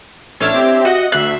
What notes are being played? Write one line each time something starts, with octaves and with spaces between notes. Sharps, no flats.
A1 A3 D4 E4 C#5 F6
C4 G4
F#4 D#5 F#5
D2 E5 F#6 C7